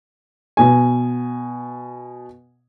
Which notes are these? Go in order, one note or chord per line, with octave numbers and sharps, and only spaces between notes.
B2 G#5